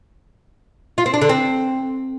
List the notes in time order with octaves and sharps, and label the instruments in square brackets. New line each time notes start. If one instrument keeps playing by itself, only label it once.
[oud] F4
C4
D4
D3
C4